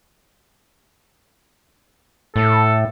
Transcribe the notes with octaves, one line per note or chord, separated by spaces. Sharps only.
A2 A4